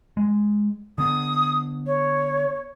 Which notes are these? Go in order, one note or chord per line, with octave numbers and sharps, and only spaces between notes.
G#3
D3 B3 D#6
C#5